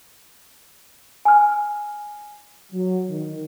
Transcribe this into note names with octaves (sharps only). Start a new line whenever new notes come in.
G#5 F6
F#3
D#3